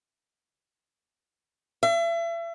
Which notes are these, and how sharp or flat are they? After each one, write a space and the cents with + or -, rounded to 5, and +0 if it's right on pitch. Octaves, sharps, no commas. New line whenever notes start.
E5 +35